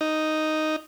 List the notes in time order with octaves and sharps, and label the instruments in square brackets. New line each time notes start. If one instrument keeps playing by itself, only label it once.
[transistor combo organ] D#4